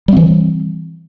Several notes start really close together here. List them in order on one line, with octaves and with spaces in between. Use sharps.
G3 C4 E3